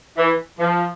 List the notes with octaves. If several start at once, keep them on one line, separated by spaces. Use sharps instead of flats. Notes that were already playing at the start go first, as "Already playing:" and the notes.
E3
F3